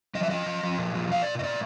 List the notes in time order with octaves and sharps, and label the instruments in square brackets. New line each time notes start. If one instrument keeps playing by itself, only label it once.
[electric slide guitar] F3 D#5
E5
F3 D#5
F3
F3
A#2
F3
A#2 F5
A#2 D5
D#5
A2 D5